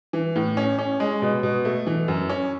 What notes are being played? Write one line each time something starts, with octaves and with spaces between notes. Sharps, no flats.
E3
A2
C#4
C#4
G#3
B2
B2
A3
E3
F#2
C#4